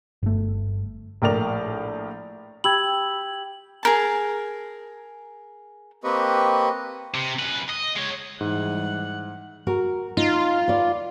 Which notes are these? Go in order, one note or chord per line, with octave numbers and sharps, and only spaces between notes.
G1 A3
A#1 A2 A#4 D5 F7
G4 B5 E6 G#6 F#7
G#4 A#4 A5
A#3 C4 G4 B4 D#5 C#6
C3
F#2 B4
D#5
G#3 C#5
G#2 E3 G3 F#5
F#4 A#4
D#4 F4
B4 D5